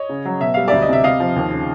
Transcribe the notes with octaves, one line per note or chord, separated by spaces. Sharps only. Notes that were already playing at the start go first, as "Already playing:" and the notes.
Already playing: C#5 D#5
C#3
F#3
B2 E5
G3 F5
D2 D5 E5
D#5
C3 E5
C3 D#5 F5
F3
D#2
C#3